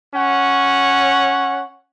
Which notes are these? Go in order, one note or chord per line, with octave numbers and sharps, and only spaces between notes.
C#4 C#5 F#5